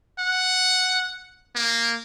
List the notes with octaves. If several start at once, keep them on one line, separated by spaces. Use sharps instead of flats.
F#5
A#3